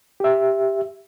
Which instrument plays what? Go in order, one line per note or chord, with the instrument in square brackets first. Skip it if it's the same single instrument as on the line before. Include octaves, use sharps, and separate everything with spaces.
[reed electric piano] G4 E5